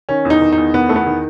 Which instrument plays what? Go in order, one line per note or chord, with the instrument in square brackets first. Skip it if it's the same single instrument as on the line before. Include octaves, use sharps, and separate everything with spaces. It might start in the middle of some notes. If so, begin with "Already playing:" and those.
[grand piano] D#3 C#4
E2
D#4
D#3
D#4
E2
D#3 B3
E2 A3
B3
D#3